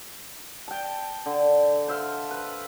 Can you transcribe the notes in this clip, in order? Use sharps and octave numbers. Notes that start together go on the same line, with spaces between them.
G5 A5
D3
C5 E5 F5
B4